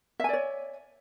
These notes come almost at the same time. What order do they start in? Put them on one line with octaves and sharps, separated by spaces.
E5 G#5 D5 C#5